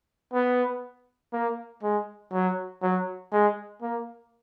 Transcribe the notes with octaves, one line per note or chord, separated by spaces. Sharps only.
B3
A#3
G#3
F#3
F#3
G#3
A#3